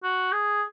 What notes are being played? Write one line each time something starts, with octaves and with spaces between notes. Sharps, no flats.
F#4
G#4